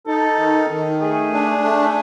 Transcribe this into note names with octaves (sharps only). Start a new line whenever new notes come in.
D#4 A4
D#3
D#3
A3 G#4
D4
A3